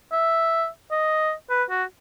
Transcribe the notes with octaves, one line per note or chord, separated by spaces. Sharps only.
E5
D#5
B4
F#4